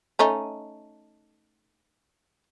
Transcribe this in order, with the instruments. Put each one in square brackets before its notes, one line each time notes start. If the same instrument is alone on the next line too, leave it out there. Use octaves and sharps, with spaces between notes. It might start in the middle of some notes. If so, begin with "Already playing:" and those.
[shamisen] A3 C#4 D#4